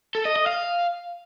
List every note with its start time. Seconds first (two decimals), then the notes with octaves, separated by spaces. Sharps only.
0.15 A4
0.25 D#5
0.36 D#5
0.46 F5